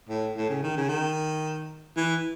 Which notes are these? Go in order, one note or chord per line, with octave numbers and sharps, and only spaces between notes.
A2
A2
C#3
D#3
C#3
D#3
E3